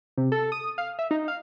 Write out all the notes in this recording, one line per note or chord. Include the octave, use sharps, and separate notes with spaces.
C3
A4
D#6
F5
E5
D#4
F5